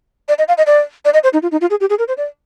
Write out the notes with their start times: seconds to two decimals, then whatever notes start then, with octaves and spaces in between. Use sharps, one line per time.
0.29 D5
0.38 D#5
0.48 F5
0.58 D#5
0.67 D5
1.05 D5
1.14 D#5
1.24 C5
1.33 D#4
1.43 F4
1.52 D#4
1.61 F4
1.70 G#4
1.81 G4
1.90 G#4
1.99 A#4
2.08 C5
2.18 D5